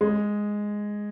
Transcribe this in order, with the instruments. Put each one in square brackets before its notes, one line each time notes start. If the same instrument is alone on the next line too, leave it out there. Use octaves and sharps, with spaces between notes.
[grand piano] G#3